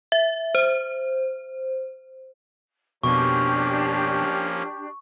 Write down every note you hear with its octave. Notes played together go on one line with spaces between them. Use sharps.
E5
C5
F2 B2 F3 A#3 C#4 D4 G4 C#6